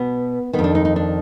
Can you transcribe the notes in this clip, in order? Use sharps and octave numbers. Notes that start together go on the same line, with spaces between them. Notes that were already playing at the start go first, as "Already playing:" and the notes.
Already playing: B2 B3
D#3 B3
F2
D4
D#4
D#4
D4